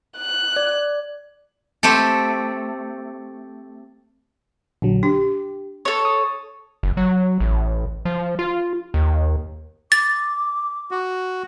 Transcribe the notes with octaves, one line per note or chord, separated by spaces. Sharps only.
F#6
D5
A3 C4 G4 A4
A#1 D3 F#3
D4 G4
A4 C#5
D#6
F#1
F#3
A1
F3
F4
D#2
D6 A6
F#4